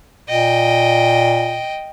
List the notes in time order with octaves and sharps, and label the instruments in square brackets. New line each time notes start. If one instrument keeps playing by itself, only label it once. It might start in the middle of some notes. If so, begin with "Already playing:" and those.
[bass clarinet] A#2 [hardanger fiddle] D#5 G5